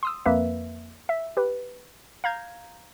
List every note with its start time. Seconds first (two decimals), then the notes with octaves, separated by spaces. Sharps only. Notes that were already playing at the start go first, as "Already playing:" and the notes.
0.03 C6 D#6 E6
0.26 F2 A#3 B4 E5
1.09 E5
1.37 G4 B4
2.24 F5 A#5 G6 G#6